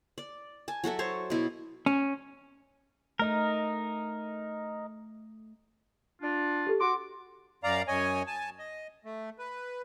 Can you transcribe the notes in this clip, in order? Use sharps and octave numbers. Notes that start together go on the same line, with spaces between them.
D5
G#5 A5
F#3 F#4 A4 E5
C5 C#5 A5
B2 E4
C#4
A3 D#4 A#4 D#5
D4 F4
G4 A4
F#4 C6 D6
F#2 D5 F5 A#5
F#2 C#5 D#5 G#5
G#5 A5
D#5
A3
B4